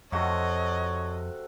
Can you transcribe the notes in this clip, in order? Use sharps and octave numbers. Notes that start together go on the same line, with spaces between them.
F2 C3 F#4 A4 C#5 D#5